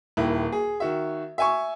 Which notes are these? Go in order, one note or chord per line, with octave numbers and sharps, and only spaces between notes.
D#1 D#3 E4
G#4
D#3 F#4 E5
E5 G#5 C#6